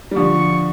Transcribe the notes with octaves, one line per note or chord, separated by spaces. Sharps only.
G3
D3 F3 C#6